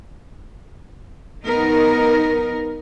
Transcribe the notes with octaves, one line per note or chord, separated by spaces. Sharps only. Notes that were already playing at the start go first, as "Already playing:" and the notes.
B3 D#4 A#4